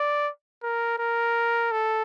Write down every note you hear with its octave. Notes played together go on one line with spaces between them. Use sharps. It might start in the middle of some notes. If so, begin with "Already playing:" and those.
Already playing: D5
A#4
A#4
A4